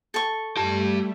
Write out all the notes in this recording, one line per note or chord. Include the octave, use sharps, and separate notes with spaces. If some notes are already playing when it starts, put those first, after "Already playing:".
A4 C#6
G3 A3 G4 A5